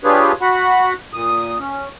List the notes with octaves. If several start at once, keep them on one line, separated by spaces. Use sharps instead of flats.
D4 F4 G4 G#4 B4 C#5
F#4 F#5 B5
A#2 D#6
C#4